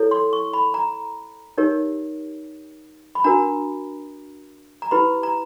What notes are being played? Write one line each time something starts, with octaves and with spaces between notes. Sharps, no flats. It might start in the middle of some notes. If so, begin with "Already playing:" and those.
Already playing: E4 A4 C#5
C6
C#6
B5
A#5
D#4 G4 A#4 C#5
B5
D4 F#4 A#4 A#5
A#5
E4 G4 B4 B5
A#5